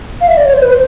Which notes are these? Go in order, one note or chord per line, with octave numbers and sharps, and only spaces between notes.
F5
E5
D5
C#5
C5
B4
C5